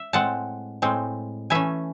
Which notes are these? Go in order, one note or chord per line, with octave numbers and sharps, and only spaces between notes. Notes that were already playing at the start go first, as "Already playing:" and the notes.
Already playing: E5
A2 G#3 C4 F#5 A5
A2 G#3 C4
E3 A3 C#4 E5 G#5